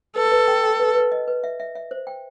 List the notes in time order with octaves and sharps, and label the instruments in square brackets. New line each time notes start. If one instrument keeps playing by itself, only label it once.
[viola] A4 [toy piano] B4
[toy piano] B4
G5
G5
B4
B4
D#5
B4
E5
E5
E5
C5
G5